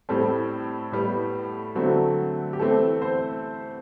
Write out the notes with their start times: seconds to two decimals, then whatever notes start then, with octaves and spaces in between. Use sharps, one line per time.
0.09 A2 G3 C4 A4
0.92 A2 G3 B3
1.75 D3 F#3 A3 C4
2.53 G4
2.59 E3 A3 C4 A4
3.02 C5